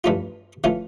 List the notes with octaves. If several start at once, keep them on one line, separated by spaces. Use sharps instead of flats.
G2 E3 A3 C#4 F4
E3 A3 C#4 F4